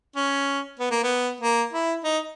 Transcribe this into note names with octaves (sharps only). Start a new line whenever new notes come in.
C#4
B3
A#3
B3
A#3
E4
D#4